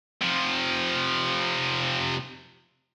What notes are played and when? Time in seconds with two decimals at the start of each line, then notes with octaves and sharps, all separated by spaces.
0.21 C3 F3